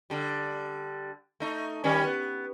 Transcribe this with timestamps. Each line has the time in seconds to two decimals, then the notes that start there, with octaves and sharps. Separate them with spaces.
0.10 D3 G3
1.40 A3 D#4
1.84 D#3 G3 C#4
2.04 B3